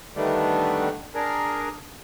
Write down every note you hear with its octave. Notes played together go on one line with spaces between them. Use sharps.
D3 D#3 G3 A3 B3 D4
D4 G#4 A#4